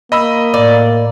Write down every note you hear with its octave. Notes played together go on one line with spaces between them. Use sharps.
A#3 D#5 B5 E6
A2 D5